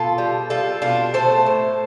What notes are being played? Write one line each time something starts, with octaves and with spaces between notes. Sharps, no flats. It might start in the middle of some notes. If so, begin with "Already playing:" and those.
Already playing: B2 F4 A4
G3
G3 F4 A4
B2 D4 F4
A3 A4 C5
A2